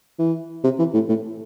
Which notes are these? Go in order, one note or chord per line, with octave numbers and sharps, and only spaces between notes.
E3
C3
E3
A2
A2